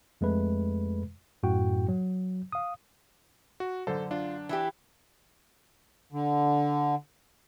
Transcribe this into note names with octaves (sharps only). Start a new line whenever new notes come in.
F2 G#3 A3 B4
F#2 A2 F#4 G5
F#3
F5 D#6
F#4
F#2 D3 A4 C5
D4 F4
E3 E4 G4
D3